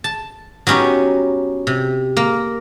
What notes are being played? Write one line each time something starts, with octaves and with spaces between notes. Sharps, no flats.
A5
F#3 B3 C#4 D#4 G4
C3
A#3